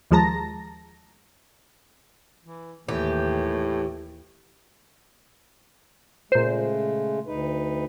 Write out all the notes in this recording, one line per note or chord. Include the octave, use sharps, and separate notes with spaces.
D#2 F3 G#3 A5 A#5 A#6
E3
D#2 A2 E3 G4
A#2 C#3 G#3 A3 C5
D2 D#4 B4